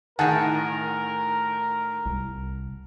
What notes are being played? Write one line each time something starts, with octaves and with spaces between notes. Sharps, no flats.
A2 D#3 G#4 A#4 F#5 A5
C2